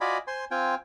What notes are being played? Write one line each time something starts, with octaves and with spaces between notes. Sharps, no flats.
F4 F#4 D5 D#5 G#5 B5
C5 G#5 C6
C4 F4 G5 G#5